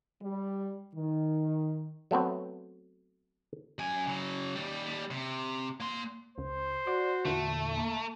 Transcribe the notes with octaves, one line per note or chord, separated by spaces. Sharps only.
G3
D#3
F#3 A3 B3 C4
F#2 G#5
C#3 F#3
D#2 G3
C3
A#3 C6
C#2 C5
F#4 D5
E2 A#2 D3 A3
A#3